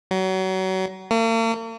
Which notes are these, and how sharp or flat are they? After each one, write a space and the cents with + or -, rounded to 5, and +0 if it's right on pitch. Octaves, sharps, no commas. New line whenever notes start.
F#3 +30
A#3 -45